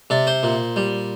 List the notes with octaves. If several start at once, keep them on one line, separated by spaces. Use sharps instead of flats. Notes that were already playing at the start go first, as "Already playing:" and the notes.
C3 D5
C5
A#2
G3